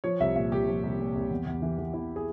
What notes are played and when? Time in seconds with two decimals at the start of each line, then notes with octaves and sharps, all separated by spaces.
0.04 F3 C#5
0.20 C2 E5
0.35 A#2 E5
0.52 C2 G4
0.68 F3
0.83 C2
0.99 A#2
1.15 C2
1.30 E2
1.47 E2
1.62 E3
1.78 E3
1.94 E2 E4
2.16 G#4